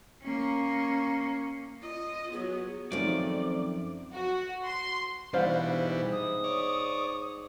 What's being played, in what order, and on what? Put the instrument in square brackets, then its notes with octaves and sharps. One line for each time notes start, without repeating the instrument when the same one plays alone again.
[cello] A#3 C#4
[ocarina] F4 [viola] D#5
[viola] F#3 B3 [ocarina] G#4
[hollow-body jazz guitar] F#2 F3 [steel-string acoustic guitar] D#3 A3 [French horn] C4 [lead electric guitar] D5
[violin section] F#4
C6
[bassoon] G#2 [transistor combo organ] B2 E3 G3 [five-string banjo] D4 C5 F5
[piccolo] D#6
[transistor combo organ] C#5 D5